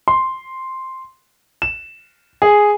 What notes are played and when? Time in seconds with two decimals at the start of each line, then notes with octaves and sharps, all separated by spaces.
0.08 C6
1.62 E7
2.42 G#4